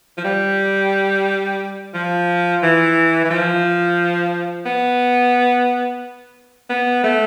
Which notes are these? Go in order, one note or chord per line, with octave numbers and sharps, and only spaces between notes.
F3
G3
F3
E3
E3
F3
B3
B3
A3